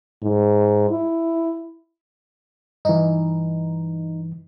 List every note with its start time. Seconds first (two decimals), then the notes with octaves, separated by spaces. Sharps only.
0.22 G#2
0.90 E4
2.85 G2 E3 D#4